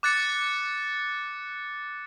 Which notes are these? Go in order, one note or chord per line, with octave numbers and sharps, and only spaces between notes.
D6 F#6 A6 C#7